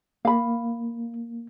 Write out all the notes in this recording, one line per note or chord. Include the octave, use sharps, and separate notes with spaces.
A#3 F5 B5